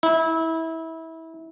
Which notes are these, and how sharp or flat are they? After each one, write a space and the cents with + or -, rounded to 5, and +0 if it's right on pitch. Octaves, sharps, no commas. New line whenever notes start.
E4 -25